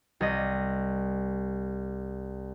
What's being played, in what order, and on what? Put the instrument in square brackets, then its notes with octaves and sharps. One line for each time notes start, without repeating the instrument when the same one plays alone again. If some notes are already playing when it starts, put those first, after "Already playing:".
[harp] C2 D#5